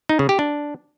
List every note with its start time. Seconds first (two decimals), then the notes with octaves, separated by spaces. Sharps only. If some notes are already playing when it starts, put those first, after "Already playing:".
0.09 D#4
0.19 C#3
0.29 G4
0.39 D4